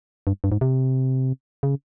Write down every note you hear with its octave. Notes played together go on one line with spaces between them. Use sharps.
G2
G2
G#2
C3
C#3